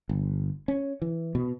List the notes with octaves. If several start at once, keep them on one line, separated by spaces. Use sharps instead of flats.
G1
C#4
E3
B2